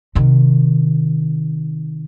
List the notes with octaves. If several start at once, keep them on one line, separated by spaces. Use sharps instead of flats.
C3 D#3